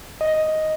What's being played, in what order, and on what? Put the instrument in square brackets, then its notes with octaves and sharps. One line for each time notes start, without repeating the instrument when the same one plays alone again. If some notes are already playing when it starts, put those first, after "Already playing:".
[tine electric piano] D#5